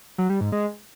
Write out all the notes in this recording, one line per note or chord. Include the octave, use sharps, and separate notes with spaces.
F#3
G3
G#2
G#3